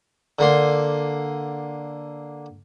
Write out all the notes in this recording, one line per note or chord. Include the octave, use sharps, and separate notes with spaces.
D3 A#3 C6